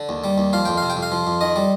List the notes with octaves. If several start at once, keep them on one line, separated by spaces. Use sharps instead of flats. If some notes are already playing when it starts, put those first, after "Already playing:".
Already playing: D3
D#2
G3
D#2
F3 F5
F2 G5
C3 F5
G5
F2
F5
F3
F2
D#3 D#5
G3